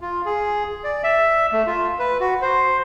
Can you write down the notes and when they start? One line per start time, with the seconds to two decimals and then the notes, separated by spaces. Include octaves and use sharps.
0.01 F4
0.26 G#4
0.84 D5
1.04 E5
1.52 A3
1.67 F4
1.99 B4
2.20 F#4
2.42 C5